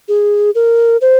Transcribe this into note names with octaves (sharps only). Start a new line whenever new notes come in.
G#4
A#4
C5